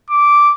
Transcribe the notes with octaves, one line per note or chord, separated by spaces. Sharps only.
D6